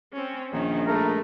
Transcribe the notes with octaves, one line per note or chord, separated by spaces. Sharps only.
C4 C#4
A#1 D#3 C#4
G#3 A3 A#4